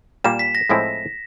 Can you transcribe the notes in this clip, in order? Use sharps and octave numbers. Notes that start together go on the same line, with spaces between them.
A#2 G3 A#3 E7
B6
A#6
A2 F3 G#3 C4 E4